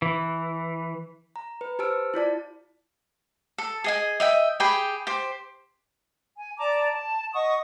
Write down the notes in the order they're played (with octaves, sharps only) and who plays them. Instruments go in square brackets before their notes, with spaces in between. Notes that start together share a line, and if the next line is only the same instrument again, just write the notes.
[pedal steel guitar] E3
[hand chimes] A#5
B4
G4 C5 A5 E6 F6 D7
E4 F4 D5 A5
[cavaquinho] A4
G#4 D#5 G#5
D#5 E5 G5
G4 G#4 G5 B5
G4 C5
[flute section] G#5
D5 A5 A#5 D6
A5
D#5 F#5 C#6 D#6